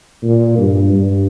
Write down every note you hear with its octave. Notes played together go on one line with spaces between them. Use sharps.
A#2
G2
G2